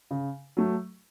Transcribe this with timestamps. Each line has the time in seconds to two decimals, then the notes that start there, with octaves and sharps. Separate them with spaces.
0.11 C#3
0.57 F#3 A3